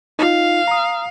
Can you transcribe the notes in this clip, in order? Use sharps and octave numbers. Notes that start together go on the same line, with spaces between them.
D#4 F4 F5
A#5 D#6